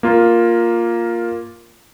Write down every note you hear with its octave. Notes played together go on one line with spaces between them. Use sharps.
A#3 F4